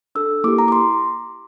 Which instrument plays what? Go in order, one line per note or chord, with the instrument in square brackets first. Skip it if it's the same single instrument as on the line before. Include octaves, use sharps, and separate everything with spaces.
[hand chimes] D4 A4 E6
A#3 E4 G4 D6
A#5
D6
C6